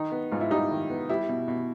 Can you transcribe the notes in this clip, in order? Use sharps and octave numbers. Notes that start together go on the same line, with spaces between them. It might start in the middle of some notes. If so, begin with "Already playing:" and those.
Already playing: D#3 D#4
B3
G#2 F4
E4
G3 D#4
D#3
B3
G3 E4
B2
B2